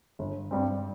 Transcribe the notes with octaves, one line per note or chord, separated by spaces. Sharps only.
G1
G2 G3 C4